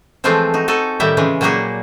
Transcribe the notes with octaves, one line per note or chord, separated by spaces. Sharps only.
E3 F3 G#3 A3 C4 F4
D#4 F#4
D#4 F#4 A4 G#5
A2 D#3 G3 E5
C#3 E3 G#3
A#2 F#3 G3 A#3 F#4 G#4